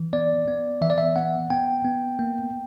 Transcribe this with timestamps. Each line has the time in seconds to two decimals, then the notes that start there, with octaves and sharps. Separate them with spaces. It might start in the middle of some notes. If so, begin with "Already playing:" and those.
Already playing: E3
0.13 B3 D5
0.48 B3
0.82 E3 E5
0.90 D5
0.98 E5
1.16 B3 F#5
1.50 B3 G5
1.85 B3
2.19 A#3